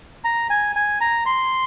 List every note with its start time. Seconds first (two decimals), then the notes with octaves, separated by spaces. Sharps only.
0.24 A#5
0.50 G#5
0.76 G#5
1.01 A#5
1.26 C6